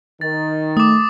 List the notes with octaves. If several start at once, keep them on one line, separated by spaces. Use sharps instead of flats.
D#3 A6
A3 D6 D#6